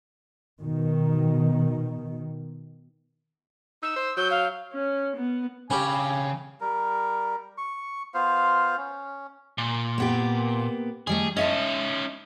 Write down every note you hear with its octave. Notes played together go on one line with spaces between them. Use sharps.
B2 D#3
D#4 E6
C5
F#3 G6
F5
C#4
B3
C#3 C#4 G4 G#5 B5
G3 A#4
C#6
B3 F4 C5 F5
C#4
A#2
A#3 B3 G4
D#3 G3 A3 G#4
C#4 D#4 D#5 E5 A5